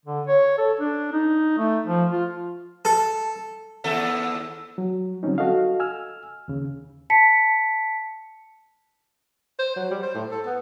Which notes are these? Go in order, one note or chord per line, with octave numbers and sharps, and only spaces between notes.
D3
C#5
A4
D4
D#4
A3
F3
F4
A4
D#2 A4 E5
F#3
D3 F#3 G3 C4 C#4 D#4
F#4 A4 D#5 F5
G#5 E6 F6
D#2 C#3
A5 B6 C#7
C5
F#3
G3
C5
A2
A4
B3